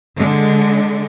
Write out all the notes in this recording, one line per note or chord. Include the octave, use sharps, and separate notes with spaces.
D3 G#3